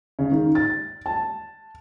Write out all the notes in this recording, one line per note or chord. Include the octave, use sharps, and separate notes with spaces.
C#3
D#3
A6
A5